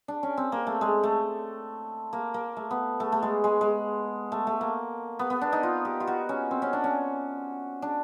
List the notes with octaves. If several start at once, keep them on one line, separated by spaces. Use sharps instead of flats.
D4
C#4
C4
A#3
A3
G#3
A3
A#3
A#3
A3
B3
A3
A3
G#3
G#3
G#3
A3
A3
A#3
B3
B3
D4
D#4
F4
G4
F4
F#4
C#4
C4
C#4
D4
C#4
D4